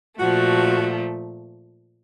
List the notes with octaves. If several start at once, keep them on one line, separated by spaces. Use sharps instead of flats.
A#2 F3 A3 F#4